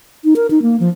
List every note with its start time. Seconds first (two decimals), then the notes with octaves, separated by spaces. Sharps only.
0.24 D#4
0.36 A#4
0.51 D#4
0.62 A#3
0.80 F3